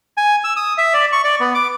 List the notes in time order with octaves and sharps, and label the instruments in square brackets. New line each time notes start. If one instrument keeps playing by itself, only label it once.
[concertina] G#5
E6
D#6
E5
D5
C#6
D5
B3
D6